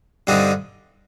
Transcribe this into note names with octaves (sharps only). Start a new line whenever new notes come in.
G2 D3 G3 C4 D#4